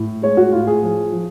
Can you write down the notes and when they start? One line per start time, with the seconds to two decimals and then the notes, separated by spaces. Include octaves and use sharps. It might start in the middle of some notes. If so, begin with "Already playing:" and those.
Already playing: A2
0.22 G#3 C#5
0.37 F#4
0.52 A2 F4
0.67 G#4
0.82 F3
1.12 F3